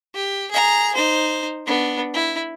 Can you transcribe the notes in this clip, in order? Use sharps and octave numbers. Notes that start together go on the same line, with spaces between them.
G4
G#4 A#5
D#4 C5
B3 D4
E4